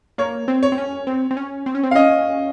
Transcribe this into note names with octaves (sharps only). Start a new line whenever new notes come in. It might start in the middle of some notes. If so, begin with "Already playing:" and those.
A#3 C#5
C4
C#5
C4
C#4
C4
C4
C#4
C4
C#4
C4
F5
C#4 D#5